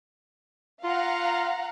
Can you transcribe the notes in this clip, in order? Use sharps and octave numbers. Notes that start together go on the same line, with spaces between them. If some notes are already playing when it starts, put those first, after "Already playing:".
F4 F5 F#5 A#5